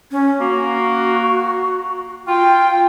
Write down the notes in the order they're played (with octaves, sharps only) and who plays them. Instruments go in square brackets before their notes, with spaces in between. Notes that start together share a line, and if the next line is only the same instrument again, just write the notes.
[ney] C#4
[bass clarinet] A#3 [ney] F#4
[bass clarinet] F4 [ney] G5